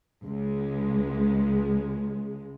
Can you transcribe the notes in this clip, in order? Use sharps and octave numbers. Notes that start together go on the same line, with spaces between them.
C#2 G#3